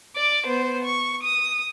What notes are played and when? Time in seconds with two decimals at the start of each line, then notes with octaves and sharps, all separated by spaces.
0.15 D5 D6
0.47 B3 C5
0.85 C#6
1.24 D#6